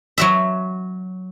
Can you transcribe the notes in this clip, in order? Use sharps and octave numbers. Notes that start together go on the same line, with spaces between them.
F#3 F#4 E5